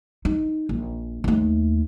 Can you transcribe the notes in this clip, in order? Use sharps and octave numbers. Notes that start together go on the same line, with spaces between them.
D#4
A#1
D#2 A3